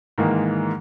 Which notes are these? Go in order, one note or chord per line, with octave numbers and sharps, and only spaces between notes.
G#2 D#3 E3 G#3 A#3